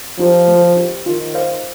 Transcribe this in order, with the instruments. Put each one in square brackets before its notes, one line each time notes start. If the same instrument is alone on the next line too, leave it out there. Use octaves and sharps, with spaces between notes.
[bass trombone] F3 [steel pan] D#4 G4 C5
[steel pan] A3
D#4 G4 C5
[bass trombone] D#3 [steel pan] F4
[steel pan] C5 F5